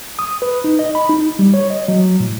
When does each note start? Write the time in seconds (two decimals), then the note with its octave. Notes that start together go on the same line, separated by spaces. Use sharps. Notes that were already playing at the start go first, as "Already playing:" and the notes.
0.19 D#6
0.42 B4
0.64 D#4
0.79 D#5
0.95 B5
1.09 D#4
1.39 G3
1.54 C#5
1.70 D#5
1.88 F#3
2.20 A2